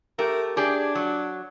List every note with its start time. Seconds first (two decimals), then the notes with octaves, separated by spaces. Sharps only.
0.19 A3 G4 A#4
0.57 D4 G4 G#4 D5
0.95 F#3